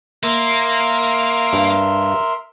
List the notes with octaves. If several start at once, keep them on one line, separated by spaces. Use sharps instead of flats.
A#3 A#4 E5 C6
G2